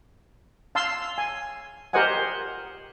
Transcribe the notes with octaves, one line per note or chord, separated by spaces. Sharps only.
F5 A5 C6 E6
G#5
G4 A#4 C5 D#5 F#5 G#5